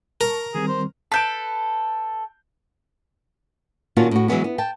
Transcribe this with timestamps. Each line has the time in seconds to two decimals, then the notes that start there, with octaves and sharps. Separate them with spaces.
0.21 A#4 A5 A#5 C#6
0.55 D#3 G3 C4 G#4
0.68 C5
1.12 A4 B4 A5 G6 D7
3.97 A#2 D#3 C#4 F4 F#4 A5
4.11 A2 F#4
4.28 E3 F#3 G#3 B3 C#4
4.44 B3
4.58 G5 A5